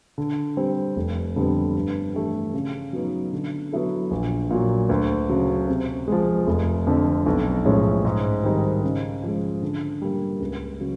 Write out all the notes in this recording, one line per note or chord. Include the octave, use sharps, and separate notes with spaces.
D3
G3 C4
F1
F2 D3 G3 B3
G2
E3 A3 D4 G4
C#3
F#3 B3 D#4
D3
F#3 B3 E4 A4
A#1
A#2 F#3
D2
C#3 F#3
C3
F3 G#3
F1
F2 D3
B1
A2 F3 G#3 C#4
G#2
D#3 G3 C4 D#4
C#3
F3 G#3
D3
G3 A#3
C#2
C#3 F#3